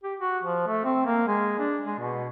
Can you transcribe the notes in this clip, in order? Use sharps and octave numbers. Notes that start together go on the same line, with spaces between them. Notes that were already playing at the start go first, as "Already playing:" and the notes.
G4
F#4
F3
A3
C4
A#3
G#3
D4
G#3
B2